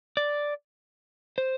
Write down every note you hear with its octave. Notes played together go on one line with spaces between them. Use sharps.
D5
C5